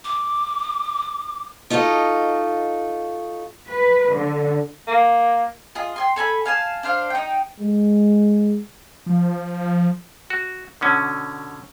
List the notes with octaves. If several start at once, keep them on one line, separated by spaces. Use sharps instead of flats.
D6
D#4 F4 F#4 A4 D#5
B4
D3
A#3
F4 G#4 D#5
G5 G#5 C6
A4 G#5 A#5 B5
F5 G#5 A5
D4 C5 F5
D#4 G5
G#3
F3
F#4
B2 D3 C#4